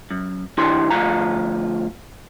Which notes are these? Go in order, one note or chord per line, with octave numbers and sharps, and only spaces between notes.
F#2
D#3 D4 E4 G4 C6
D2 F3 F4 A#5